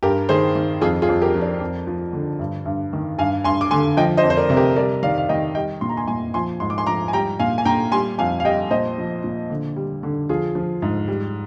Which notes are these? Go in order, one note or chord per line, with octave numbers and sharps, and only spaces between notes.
G2 G4 A#4
D#3 G#4 C5
D#3
F2 F4 G#4
F4 G#4
F2
G4 A#4
F3
A#4 D5
F2
F3
D3
G2
G2
D#3
G2 F5 G#5
G2 G#5 C6
D6
D3 G#5 C6
F3 D#5 G5
C5 D#5
F2
C5
A#4 D5
C3
G4 A#4
G3 A#4 D5
D#3 D5 F5
F5
D#3 D#5 G5
G3 D#5 G5
A#2 C6
A#5
G#5 C6
A#2 G#5 C6
F3 G#5 C6
G#2 C6
D6
G#5 C6
F3 A#5 D6
G#5
G3 G5 A#5
A#2 F5 G#5
G#5
A#2 G5 A#5
G3 G#5 C6
F2 F5 G#5
F5
G3 D#5 G5
A#2 C5 D#5
F3
A#2
D3
G3
D3
F3 F4 G#4
F3
G#2
G3